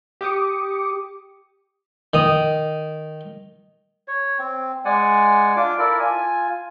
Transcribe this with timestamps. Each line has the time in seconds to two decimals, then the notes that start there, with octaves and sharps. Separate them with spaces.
0.21 G4 D6 D#6 C#7
2.14 D#3 D#6
4.08 C#5
4.39 C4
4.85 G#3 D5 F#5 G#5
5.56 D4 F4 D6
5.79 E4 A4 A#4 D5
6.00 F4 G#5